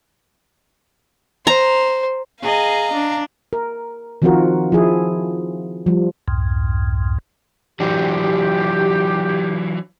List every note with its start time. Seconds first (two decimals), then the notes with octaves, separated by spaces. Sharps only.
1.47 C5 A#5
2.42 G#4 D#5 F5 A#5
2.94 D4
3.53 A#4
4.22 D#3 F3 C4 F4 F#4 A#4
4.72 F3 E4 G#4
5.86 F3 G3
6.28 C2 F2 G#2
7.80 E3 F#3 D4 G4